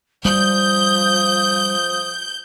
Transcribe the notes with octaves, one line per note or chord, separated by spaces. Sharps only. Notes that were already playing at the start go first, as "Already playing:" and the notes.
F3 G3 D#6 G6